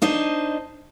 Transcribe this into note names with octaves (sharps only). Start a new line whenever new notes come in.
D4 D#4 C5 D#5